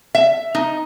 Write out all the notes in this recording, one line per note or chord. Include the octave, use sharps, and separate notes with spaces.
E5
D#4